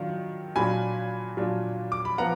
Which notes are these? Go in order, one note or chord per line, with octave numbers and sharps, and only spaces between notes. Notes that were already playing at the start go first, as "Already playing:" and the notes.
Already playing: D#3 F#3 D4 F4
A#2 F#3 D4 F4 G#5 B5
A#2 F#3 D4 F4
D6
B5
F3 B3 F4 F#5 A#5